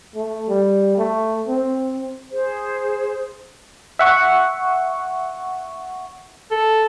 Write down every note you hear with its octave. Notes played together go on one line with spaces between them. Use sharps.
A3
G3
A3
C4
G#4 C5
E5 F#5 C#6
A4